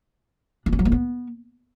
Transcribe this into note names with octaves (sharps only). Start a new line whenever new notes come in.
D4
C#4
F#3
A#3
B3